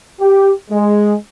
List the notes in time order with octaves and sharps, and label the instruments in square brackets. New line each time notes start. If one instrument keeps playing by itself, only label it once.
[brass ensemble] G4
G#3